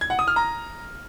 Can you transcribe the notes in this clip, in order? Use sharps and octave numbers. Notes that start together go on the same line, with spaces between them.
G#6
F#5
D#6
F6
A#5